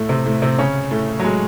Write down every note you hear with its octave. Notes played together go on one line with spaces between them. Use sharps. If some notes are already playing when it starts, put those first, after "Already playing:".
Already playing: A2 A3
C3 C4
A2 A3
C3 C4
C#3 C#4
A2 A3
F#3
G#3